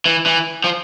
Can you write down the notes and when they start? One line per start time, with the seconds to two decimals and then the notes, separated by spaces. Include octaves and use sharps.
0.06 E3
0.26 E3
0.64 F3